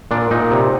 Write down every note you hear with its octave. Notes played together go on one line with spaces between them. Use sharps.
A#2 D4
A#2 D#4
C3